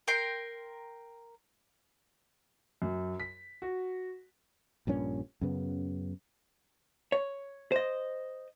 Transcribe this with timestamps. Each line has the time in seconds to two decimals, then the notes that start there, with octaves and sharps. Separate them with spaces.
0.08 A#4 G5 C6
2.82 F#2
3.20 B6
3.62 F#4
4.87 A#1 G2 A#2 C#4
5.41 F#2 C#3 B3
7.12 C#5
7.72 C5 D#5